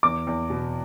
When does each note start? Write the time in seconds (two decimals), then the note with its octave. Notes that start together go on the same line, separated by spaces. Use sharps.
0.03 E2 D6
0.27 E2
0.50 B2